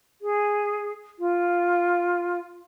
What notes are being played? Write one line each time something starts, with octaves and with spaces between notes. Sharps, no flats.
G#4
F4